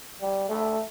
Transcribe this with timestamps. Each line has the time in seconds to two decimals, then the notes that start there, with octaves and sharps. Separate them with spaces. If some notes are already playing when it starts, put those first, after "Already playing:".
0.21 G3
0.49 A3